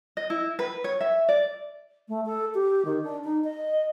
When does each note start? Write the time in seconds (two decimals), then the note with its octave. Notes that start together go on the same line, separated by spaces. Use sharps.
0.17 D#5
0.30 E4
0.59 B4
0.84 C#5
1.01 E5
1.29 D5
2.08 A3
2.26 A4
2.54 G4
2.85 D#3
3.03 D4
3.24 D#4
3.44 D#5